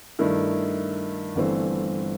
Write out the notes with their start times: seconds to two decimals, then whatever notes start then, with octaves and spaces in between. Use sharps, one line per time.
0.19 G2 D#3 A3 E4
1.36 G1 G2 E3 A3 C4